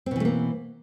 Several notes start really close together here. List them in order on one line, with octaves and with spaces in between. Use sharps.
C4 B2 E3 A3 A#3